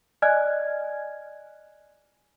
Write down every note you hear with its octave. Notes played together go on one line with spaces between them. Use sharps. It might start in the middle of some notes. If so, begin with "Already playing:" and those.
D5 D#5 G#5 F6 F#6 G#6